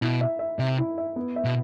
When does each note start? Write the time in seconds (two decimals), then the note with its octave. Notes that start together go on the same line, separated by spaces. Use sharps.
0.02 B2 E4
0.21 E5
0.39 E5
0.59 C3 E5
0.78 E4
0.98 E5
1.16 B3
1.36 E5
1.45 B2